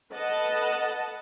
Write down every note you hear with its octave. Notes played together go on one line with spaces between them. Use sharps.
A4 B4 D#5 F#5 A5